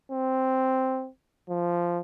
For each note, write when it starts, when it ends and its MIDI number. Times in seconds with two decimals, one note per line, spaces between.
0.12 1.09 60
1.49 2.01 53